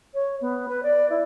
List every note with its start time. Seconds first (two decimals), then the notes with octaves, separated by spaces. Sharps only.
0.14 C#5
0.41 B3
0.68 B4
0.83 D5
1.10 E4